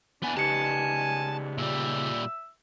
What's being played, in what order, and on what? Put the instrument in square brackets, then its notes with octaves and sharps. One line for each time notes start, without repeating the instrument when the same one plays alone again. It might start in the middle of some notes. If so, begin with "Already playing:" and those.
[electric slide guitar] B2 G#5 [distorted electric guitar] B3 E4 [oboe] D4
[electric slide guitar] C#3 D#4 B4 [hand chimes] G4 C#7 [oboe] G#5 [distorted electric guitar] A5
[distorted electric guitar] A#2 G3 [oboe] E5